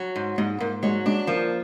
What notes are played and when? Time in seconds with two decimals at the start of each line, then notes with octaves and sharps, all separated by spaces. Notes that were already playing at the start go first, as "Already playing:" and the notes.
Already playing: F#3
0.16 G#2
0.38 G#2 G#3
0.60 G#2 A#3
0.83 F#3 G#3
1.06 G#3 D4
1.27 F3 A#3